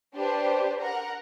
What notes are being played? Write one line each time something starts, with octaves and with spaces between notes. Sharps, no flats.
D4 G4 B4 C5
A#4 F#5 A#5